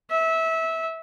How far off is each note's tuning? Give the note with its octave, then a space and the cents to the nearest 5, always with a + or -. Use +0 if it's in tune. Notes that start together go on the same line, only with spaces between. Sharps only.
E5 -20